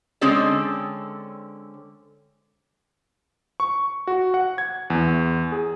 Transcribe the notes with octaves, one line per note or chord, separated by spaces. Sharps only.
D3 G#3 C4 C#4 A4 D5
C#6
F#4
F#5
G#6
E2
G#4